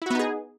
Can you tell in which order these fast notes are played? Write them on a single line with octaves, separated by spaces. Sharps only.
E4 F#4 B3 D#4 G#4